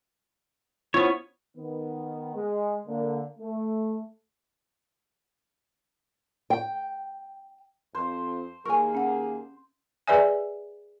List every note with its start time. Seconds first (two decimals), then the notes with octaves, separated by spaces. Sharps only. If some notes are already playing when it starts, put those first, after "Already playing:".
0.94 B3 C#4 E4 F4 C5 C#5
1.57 D#3 B3
2.35 G#3
2.87 D3 A#3
3.39 A3
6.50 G5
7.95 F2 C5
8.66 D#2 A#3 G#4 A#4 G#5 C#6
8.95 C#4 F#5
10.07 G#4 B4 D5 E5 G#5